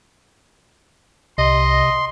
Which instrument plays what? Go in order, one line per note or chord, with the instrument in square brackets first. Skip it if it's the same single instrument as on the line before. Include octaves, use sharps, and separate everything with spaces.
[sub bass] C2 [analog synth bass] C3 [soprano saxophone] D#5 [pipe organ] C6